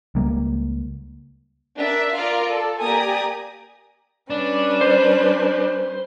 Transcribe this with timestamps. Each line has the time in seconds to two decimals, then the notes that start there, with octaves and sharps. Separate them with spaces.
0.15 C#2 G3 A#3
1.78 D4 A#4 E5
2.15 F4 A#4 D5 F5
2.48 A4
2.84 A#3 G4 D5 G#5 A#5 D#6
4.30 G3 C#4 D4 B4
4.81 C5